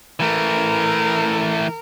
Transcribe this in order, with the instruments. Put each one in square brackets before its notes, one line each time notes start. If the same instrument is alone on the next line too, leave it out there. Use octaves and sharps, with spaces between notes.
[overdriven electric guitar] E3 A3 [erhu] A#4